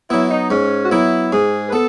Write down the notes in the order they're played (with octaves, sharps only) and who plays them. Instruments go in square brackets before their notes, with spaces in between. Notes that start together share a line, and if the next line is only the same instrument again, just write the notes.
[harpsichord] F#3 B3 [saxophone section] E4
[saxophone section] D#4
[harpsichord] G#2 [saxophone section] C#4
[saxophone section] F#4
[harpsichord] F#3 B3 [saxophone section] E4
[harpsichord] G#2 [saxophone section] G#4
[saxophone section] B4
[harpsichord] B3 [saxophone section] A4